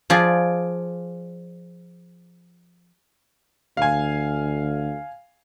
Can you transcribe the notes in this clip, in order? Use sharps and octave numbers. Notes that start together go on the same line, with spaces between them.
F3 G#4 D5
D2 F5 G#5